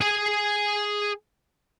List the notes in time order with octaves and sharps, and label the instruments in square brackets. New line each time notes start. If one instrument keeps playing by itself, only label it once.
[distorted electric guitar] G#4 G#5